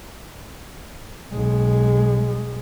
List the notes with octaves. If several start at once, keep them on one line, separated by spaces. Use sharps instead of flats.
B1 G#3